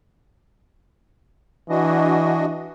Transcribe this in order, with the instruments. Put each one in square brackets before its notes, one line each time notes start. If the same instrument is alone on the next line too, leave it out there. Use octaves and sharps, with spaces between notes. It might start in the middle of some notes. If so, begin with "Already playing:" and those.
[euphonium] E3 [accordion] D4 F#4 D#5